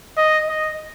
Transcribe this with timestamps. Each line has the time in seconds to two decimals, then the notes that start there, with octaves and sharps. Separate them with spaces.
0.17 D#5
0.48 D#5